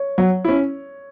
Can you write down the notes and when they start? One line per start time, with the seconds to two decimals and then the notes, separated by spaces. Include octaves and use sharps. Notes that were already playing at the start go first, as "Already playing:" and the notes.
Already playing: C#5
0.18 F#3
0.44 C#4 E4